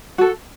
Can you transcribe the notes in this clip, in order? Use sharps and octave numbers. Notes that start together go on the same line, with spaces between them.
F#4 A4